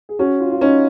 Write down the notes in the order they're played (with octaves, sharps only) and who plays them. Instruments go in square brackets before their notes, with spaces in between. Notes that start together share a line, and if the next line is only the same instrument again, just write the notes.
[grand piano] G#4
[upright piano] C#4 [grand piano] F#4
[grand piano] F4
F4
[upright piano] C#4 [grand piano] D#4